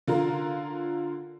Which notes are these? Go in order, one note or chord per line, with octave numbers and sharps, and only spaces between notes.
D3 F4 A#4